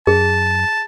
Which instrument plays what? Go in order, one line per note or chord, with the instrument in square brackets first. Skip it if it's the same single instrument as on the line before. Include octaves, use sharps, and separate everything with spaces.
[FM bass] F#2 [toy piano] G#4 [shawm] A5